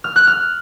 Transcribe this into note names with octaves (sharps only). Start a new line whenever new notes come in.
F6
F#6
F6